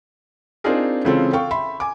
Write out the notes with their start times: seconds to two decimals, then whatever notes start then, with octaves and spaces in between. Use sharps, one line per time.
0.64 C4 D4 D#4 F4 G#4 A#4
1.05 C#3 E3 G#3 C4 F4 A4
1.33 A4 F5 G5 C#6
1.51 E5 B5 C6
1.80 G#5 D6